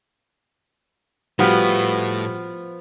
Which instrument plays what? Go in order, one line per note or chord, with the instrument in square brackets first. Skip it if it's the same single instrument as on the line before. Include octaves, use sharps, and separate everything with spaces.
[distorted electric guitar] A2 [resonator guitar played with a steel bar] F3 B3 [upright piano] G3 F#4